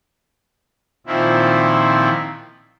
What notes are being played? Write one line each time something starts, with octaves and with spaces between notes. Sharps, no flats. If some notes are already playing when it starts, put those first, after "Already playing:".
A#2 D#3 F3 C4 E4